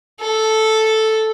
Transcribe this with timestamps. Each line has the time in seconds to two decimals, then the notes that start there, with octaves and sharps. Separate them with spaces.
0.21 A4